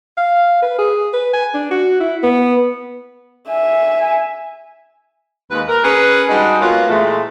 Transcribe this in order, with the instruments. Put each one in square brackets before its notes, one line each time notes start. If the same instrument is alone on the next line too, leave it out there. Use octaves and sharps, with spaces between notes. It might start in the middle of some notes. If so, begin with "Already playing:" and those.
[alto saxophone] F5
B4
G#4
B4
G#5
D4
F#4
E4
B3
[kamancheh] E5 G#5
[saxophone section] D#2 G#3 B4
A#4
C#4 G#4 A#4 B4
G3 G#3 D4 D#4 F#4 G#4
G#3 A#3 B3 C#4 F4 F#4
A#2 E3 G#3 A3